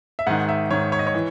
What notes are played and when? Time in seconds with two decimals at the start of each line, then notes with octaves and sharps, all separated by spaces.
0.19 E5
0.27 G#2 D#3 F#5
0.49 E5
0.71 G#2 D#3 C#5
0.92 C#5
0.99 D#5
1.07 C#5
1.14 E3